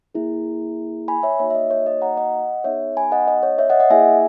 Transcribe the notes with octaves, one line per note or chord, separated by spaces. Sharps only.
A#3 E4 G#4
G#5 B5
C#5 E5
A#3 D#4 F#4 C#5 E5
E5
D#5
C#5
D#5
F#5 A#5
D#5 F#5
B3 D#4 G#4 C#5 E5
G#5 B5
D#5 F#5
D#5
C#5
C#5 E5
D#5 F#5
D#5 F#5
A#3 E4 G#4 E5 G#5